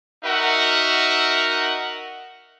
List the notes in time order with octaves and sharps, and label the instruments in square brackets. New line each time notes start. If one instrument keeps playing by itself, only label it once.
[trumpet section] D#4 F#4 A#4 E5 F#5